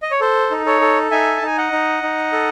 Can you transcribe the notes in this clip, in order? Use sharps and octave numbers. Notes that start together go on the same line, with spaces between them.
D#5
C#5
A4 C5
D#4
A4 C#5
A4
D#4 E5 G#5
A5
D#4 G#5
D#5 F#5
D#4
D#4
A4